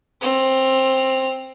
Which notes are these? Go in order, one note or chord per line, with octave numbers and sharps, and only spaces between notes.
C4 F7